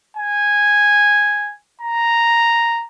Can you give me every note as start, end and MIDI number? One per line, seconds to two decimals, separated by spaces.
0.16 1.55 80
1.81 2.85 82